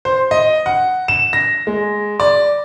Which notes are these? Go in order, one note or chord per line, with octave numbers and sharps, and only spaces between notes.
C5
D#5
F#5
E7
A#6
G#3
D5